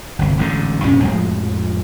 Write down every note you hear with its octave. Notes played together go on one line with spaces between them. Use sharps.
G1 C2
A1 G#2 B2 D3
A#1 G2 C3 C#4
F2 A2 F3 G#3